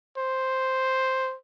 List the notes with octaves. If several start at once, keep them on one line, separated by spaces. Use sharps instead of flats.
C5